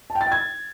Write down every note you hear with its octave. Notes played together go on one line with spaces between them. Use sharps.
A5
G5
A6
G5
G#6